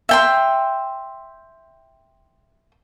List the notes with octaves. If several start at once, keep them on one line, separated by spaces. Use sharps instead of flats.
E5 G5 C6